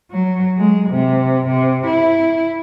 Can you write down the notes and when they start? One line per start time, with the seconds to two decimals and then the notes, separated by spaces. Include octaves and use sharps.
0.11 F#3
0.58 G#3
0.90 C3
1.48 C3
1.87 E4